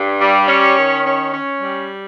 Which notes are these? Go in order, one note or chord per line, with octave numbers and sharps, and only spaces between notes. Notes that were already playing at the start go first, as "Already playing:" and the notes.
Already playing: G2
G3
C#4
D#3
C#4
C#4
G3